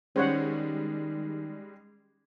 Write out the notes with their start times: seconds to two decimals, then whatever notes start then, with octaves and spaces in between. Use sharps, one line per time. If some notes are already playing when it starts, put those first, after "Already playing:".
0.16 D#3 G3 G#3 C#4 C5 C#5 F#5